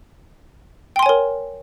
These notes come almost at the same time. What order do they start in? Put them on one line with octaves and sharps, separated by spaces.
G5 C6 G#5 C#5 A#4